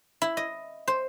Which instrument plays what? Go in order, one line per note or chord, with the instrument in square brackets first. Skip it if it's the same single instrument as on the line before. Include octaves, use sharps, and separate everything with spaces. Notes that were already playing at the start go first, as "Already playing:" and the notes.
[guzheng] E4
D#5
C5